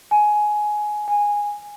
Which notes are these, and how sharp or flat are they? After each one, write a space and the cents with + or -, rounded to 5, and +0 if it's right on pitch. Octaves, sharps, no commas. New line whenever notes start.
G#5 +15
G#5 -10